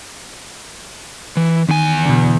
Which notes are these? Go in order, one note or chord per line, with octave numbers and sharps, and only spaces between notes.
E3
E2 D#3 G#5
B2 D3